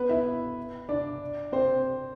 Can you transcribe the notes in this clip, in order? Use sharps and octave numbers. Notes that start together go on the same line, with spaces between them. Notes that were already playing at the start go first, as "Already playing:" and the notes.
Already playing: B3 B4
E4 E5
D4 D5
C4 C5